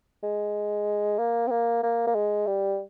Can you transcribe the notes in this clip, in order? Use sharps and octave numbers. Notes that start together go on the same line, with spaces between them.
G#3
A#3
C4
A#3
A#3
A#3
G#3
G3